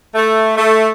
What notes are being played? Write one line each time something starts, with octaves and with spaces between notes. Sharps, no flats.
A3
A3